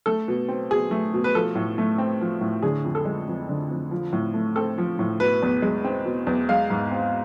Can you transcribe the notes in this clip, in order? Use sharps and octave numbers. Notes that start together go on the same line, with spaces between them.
A3 A4
B2
C4
B2 G#4
A3
B2
B4
F3 A4
A2
A3
C4
F3
A2
D3 G#4
F2
A4
G#3
F2
D3
F2
F3
A2
A3
C4 A4
F3
A2
B2 B4
E2
G#3
C4
B2
E2
G#3 F5
G#2
C4